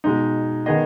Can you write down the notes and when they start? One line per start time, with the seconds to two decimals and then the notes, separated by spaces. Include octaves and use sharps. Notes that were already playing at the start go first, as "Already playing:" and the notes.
0.04 B2 G#3 D#4
0.66 D#3 B3 G#4 D#5